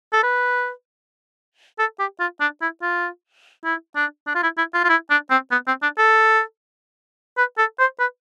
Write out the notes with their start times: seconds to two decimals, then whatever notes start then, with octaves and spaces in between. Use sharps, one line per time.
0.13 A4
0.23 B4
1.79 A4
1.99 G4
2.20 F4
2.40 D4
2.61 E4
2.82 F4
3.64 E4
3.95 D4
4.27 D4
4.35 F4
4.43 E4
4.58 E4
4.74 F4
4.84 F4
4.89 E4
5.10 D4
5.30 C4
5.51 B3
5.67 C4
5.82 D4
5.98 A4
7.37 B4
7.58 A4
7.79 C5
7.99 B4